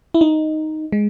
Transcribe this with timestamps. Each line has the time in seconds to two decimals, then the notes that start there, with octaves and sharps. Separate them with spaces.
0.14 E4
0.21 D#4
0.92 G#3